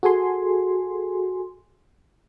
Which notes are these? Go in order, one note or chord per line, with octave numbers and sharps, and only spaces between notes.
F#4 G#4 A4 G#5 C6